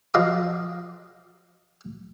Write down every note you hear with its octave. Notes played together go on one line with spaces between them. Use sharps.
F3 F#3 D#5 F5 C6 D6